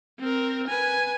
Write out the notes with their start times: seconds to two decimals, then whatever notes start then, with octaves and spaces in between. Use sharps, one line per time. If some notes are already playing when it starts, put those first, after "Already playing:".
0.19 C4 A#4
0.67 B4 G#5